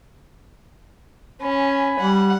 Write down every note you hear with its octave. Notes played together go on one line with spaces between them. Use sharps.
C#4 G#5 B5
G3 F#5